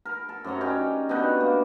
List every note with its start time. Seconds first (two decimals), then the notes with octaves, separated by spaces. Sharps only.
0.05 A#4
0.29 A4
0.44 F#2 C3 C#5 A#5
0.61 C#4 D#4 G4 D5
1.09 B2 D#3 D4 D#4
1.41 A#3